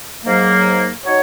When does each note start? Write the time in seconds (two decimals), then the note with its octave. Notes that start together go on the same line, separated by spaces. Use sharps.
0.24 G#2 F#3 A#3
1.05 F#3 D#4 F#4 C#5